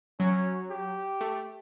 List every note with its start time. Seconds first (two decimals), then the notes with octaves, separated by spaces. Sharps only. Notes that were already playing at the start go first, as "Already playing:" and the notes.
0.20 F#3 C#4
0.71 G4
1.21 A3